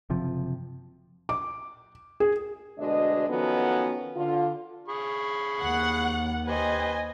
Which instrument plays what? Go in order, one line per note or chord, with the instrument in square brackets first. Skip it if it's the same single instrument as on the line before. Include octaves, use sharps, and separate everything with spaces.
[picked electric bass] F#1 C3 F3
[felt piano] D6
G#4
[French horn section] D2 B2 G#3 D4 D#5
D#3 F3 F#3 B3 C#4 A4
D3 F4
[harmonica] G#4 B5 C#6
[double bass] D#2 [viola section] F#5
[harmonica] G4 B4 C5 [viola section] D#5 G#5